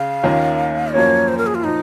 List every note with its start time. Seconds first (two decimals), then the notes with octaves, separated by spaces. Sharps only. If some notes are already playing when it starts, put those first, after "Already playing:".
Already playing: C#3 F5
0.23 D#2 D#3 A#3 C#4 F4
0.94 F#2 F3 A#3 C#4 C#5
1.28 C5
1.38 A#4
1.47 G#4
1.55 F4
1.64 A#2 F3 D#4